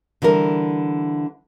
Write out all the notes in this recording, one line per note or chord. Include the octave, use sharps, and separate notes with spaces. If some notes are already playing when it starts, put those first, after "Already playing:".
D3 E3 G3 A#4